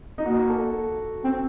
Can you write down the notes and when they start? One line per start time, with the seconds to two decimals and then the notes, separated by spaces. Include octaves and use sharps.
0.18 D#4
0.25 A#3 F#4
0.50 A4
1.24 C4